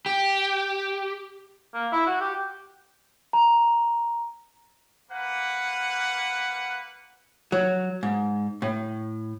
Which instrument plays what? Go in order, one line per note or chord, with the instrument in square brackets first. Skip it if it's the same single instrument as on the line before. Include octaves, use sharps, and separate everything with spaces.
[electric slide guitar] G4
[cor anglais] A#3
E4
F#4
G4
[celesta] A#5
[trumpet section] A#3 B4 F#5
[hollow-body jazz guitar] F#3
G#2
A2